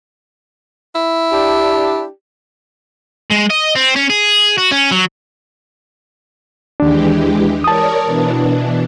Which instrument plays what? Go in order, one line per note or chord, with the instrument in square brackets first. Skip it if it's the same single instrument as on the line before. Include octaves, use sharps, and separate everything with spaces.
[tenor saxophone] E4
[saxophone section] D4 G4
[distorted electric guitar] G#3
D#5
C4
C#4
G#4
F#4
C#4
F#3
[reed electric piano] D#2 D4 [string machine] E3 G#3 G4
[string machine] A#4 C#5 D5 [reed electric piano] A5 D#6
[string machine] B2 E3 D4